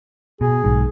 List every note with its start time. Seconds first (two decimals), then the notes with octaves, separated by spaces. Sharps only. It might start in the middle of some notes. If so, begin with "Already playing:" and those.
0.41 B2 G#4
0.64 B1 G#2